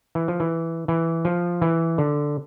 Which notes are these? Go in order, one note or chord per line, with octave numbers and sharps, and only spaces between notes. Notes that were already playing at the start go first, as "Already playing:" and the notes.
E3
F3
E3
E3
F3
E3
D3